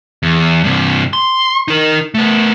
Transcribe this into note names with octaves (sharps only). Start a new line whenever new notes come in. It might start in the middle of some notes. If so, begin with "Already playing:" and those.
E2
G2 C3
C6
D#4 A#4
A3 B3